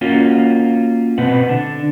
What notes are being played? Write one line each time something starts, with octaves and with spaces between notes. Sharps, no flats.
A#3 C#4 F4 F#4
B2 C4 B4 F#5
D3 D4